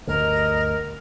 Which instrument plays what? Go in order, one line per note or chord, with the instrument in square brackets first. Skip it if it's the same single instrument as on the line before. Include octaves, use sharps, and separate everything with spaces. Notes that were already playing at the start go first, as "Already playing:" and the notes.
[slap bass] D2 G2 D3 [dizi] A#4 [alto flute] D#5